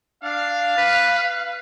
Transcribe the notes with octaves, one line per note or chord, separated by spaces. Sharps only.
D4 F5
B4